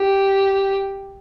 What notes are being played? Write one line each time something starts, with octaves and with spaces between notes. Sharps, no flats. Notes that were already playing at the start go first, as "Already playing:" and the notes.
Already playing: G4